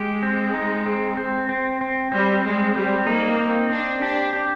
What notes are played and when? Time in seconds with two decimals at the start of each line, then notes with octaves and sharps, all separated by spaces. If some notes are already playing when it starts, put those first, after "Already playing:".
Already playing: G#3 G4
0.23 C4
0.54 D#4
0.86 C4
1.17 C4
1.49 C4
1.81 C4
2.12 G3 C4
2.44 G#3 C4
2.75 G3 C4
3.06 A#3 D#4
3.39 C4
3.70 C4 D4
4.01 D4 G4
4.33 G4